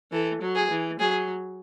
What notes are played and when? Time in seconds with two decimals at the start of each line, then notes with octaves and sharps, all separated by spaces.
0.11 E3 A4
0.42 F#3
0.56 G#4
0.70 E3
0.99 F#3 G#4